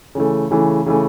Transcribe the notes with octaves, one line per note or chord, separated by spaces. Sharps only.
C#3 E3 A3
C#3 E3 A3
C#3 E3 A3